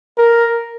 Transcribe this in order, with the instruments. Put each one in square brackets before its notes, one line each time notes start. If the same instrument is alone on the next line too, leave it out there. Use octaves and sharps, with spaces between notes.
[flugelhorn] A#4